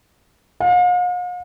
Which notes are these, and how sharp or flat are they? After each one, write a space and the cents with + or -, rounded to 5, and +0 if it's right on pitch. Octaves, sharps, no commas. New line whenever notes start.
F5 +45